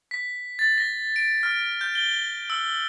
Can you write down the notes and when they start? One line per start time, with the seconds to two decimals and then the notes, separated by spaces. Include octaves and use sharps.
0.11 B6
0.59 A6
0.78 A#6
1.16 D7
1.43 F6
1.81 G6
1.95 G7
2.50 E6